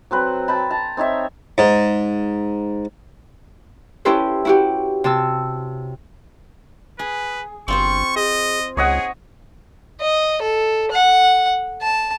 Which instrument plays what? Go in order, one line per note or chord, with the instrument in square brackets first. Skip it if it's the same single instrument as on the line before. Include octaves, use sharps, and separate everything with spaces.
[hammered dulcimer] F#3 C4 B4
G5 A5 B5
A5 A#5
C4 D#4 C#5 E5
[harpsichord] G#2
[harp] C#4 E4 G4 A4 B4 C5
E4 F#4 G4
C3 A5 E6
[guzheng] G#4 [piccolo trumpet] B4
[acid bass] G1 [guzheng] C4 F4 C5 [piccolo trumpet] C#6
[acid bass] G#4 [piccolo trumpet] D#5
[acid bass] C#2 [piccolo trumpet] G#4 [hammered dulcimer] C#5 D#5 F#5
[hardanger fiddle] D#5
A4
F#5
A5